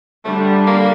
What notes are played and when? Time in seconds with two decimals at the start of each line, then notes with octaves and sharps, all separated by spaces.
0.25 D3 G3 A3 D4
0.67 A#3